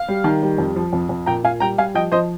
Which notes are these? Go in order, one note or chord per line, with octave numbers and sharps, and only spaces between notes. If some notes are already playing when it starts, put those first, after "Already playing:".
Already playing: F5
G3
D#3
G3
F2
F3
F2
F2
A#2 G5 A#5
A#2 F5 G#5
G3 G5 A#5
G3 F5 G#5
F3 D#5 G5
F3 C5 D#5